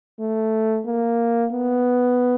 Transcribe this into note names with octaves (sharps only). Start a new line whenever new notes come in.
A3
A#3
B3